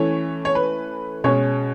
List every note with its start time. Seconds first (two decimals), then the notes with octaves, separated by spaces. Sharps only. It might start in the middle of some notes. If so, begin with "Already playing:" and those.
Already playing: E3 A3 C#4 C#5
0.45 C#5
0.55 B4
1.24 B2 G#3 C#4 C#5